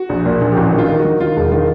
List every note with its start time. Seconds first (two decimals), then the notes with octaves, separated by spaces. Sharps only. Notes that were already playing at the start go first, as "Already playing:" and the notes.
Already playing: F#4
0.09 A#1
0.25 A#2
0.41 A#1
0.52 G4
0.56 A1 F#4
0.72 D#3
0.78 F4
0.88 D#3
0.99 F#4
1.05 D#3
1.20 D#3 F4
1.36 E1
1.51 D#3 F4